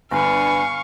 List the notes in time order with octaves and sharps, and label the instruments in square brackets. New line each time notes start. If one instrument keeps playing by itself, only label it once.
[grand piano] G1 [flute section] D4 B4 B5 [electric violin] F5 C#6 [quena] G#5